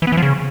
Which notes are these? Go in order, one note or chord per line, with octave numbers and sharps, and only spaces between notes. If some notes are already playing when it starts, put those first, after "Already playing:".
E3
B3
E3
F3
C#3